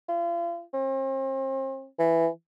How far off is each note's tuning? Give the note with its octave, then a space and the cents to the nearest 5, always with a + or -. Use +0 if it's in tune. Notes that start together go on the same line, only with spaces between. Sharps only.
F4 -40
C4 +40
E3 +5